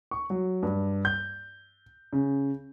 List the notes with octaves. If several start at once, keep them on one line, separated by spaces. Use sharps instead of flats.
C#6
F#3
G2
G6
C#3